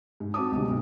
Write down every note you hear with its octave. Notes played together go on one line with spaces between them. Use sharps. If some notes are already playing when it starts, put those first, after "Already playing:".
G#2
C4 F#4 A5 D6 D#6
C#2 B2 D3 G3
B1 F#3